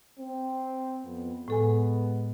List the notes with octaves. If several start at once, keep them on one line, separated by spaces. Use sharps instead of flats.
C4
F2 B3
A2 G#3 B3 A4 G#5